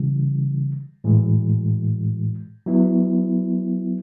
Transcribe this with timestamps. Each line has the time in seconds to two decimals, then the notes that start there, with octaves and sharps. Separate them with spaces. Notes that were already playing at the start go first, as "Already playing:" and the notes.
Already playing: C#3 E3 G3
1.04 A2 E3 G#3
2.66 F#3 B3 E4